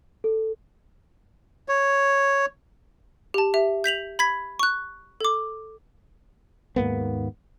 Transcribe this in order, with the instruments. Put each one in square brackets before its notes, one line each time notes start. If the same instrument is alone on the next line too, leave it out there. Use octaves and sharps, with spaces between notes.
[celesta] A4
[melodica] C#5
[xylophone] G4 A5
G4 E5
G6 B6 F7 F#7
B5 G#6 B6
C#6 F#6
A4 D6
[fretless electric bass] D#2 G#2 A#3 B3